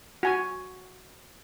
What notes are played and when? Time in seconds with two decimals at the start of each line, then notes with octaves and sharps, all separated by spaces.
0.23 F#4 G#5